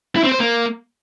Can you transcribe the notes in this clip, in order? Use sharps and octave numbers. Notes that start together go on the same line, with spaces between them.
E4
C4
C5
A#3